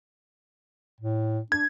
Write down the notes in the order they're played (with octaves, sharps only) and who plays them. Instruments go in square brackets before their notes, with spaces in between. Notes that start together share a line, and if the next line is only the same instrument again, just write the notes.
[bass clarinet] A2
[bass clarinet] D4 [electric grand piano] G#6